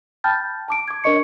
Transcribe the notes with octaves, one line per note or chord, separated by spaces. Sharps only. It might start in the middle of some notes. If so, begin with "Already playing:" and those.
G5 A5 B5 F6 G6 A6
A5 D6 D7
D6 G#6
D4 A#4 C#5 D#5 C#6 C#7